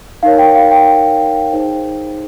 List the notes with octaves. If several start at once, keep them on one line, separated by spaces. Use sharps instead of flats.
D#4 A#4 C#5 F5
G5
F5
G5
D#4 G#4 C5